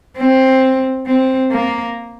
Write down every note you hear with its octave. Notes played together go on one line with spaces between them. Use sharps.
C4
C4
A#3